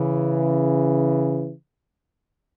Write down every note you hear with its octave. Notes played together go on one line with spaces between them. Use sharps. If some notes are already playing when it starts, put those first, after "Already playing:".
Already playing: C#3 E3